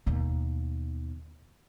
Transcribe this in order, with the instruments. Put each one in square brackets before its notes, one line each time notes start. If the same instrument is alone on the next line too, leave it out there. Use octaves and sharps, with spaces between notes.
[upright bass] D#2 B2